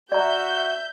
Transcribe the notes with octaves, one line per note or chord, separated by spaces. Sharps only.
F#4 D5 E5 A#5 G6